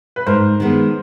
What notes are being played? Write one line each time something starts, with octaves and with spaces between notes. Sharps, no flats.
B4
G#2 A#4 C5
D#3 G#3 B3